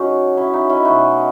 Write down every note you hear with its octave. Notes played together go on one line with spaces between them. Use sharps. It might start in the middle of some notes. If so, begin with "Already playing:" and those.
Already playing: C#3 F#3 C#4 D#4 F#4
C#4 E4
D#4
C#4 E4
B2 G#3 D#4 F#4